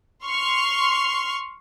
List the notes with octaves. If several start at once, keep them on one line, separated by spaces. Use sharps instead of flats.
C6 C#6 F6